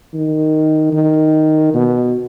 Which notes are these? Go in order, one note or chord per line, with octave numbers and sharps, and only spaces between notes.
D#3
D#3
B2